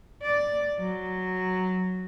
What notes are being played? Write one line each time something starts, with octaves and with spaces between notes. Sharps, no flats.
D5
F#3